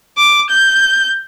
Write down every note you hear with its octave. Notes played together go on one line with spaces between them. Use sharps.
D6
G6